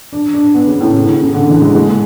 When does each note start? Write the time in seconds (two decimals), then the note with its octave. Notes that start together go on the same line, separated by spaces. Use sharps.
0.13 D4
0.34 D4
0.54 B3
0.67 C#3
0.80 A2
0.94 C#3
1.08 C#3
1.22 C#3
1.34 D3
1.48 E3
1.61 G#3
1.75 G#3